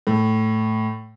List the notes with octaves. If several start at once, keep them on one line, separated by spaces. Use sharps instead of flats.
A2